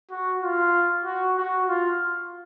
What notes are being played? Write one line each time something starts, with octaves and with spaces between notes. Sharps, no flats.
F#4
F4
F#4
F#4
F4